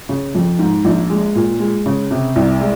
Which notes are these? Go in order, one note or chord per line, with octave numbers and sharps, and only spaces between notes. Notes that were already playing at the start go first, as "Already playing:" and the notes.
C#3
F2
G#2
A#1
G#3
A#2
G#3
C#3
C3
C2
G#3